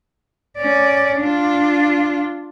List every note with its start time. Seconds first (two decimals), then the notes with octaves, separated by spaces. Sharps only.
0.57 C#4 D5
1.20 D4 F4